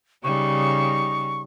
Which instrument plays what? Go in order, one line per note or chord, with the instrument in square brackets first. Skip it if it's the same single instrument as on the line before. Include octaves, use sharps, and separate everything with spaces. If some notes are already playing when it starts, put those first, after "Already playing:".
[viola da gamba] C#3 G3 D#4 [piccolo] C#6